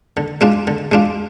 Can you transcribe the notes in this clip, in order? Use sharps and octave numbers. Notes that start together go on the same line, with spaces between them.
D3
G#3 D4 F4
D3
G#3 D4 F4